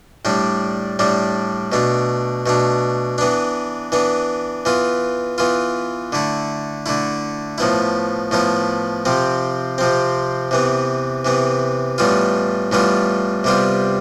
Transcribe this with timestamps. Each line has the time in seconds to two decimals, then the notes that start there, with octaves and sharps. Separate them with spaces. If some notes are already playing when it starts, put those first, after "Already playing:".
0.25 A2 G3 D4
0.99 A2 G3 D4
1.72 B2 A3 D4
2.46 B2 A3 D4
3.18 E3 B3 D4
3.92 E3 B3 D4
4.65 E3 B3 F4
5.38 E3 B3 F4
6.12 D3 A3 E4
6.86 D3 A3 E4
7.58 A2 F3 B3 E4
8.31 A2 F3 B3 E4
9.05 C3 F3 C4
9.78 C3 F3 C4
10.51 C3 E3 B3
11.25 C3 E3 B3
11.98 A2 E3 G3 B3 F4
12.72 A2 E3 G3 B3 F4
13.44 C3 G3 B3 F4